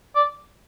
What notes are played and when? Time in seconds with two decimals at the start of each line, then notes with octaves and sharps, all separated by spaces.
0.16 D5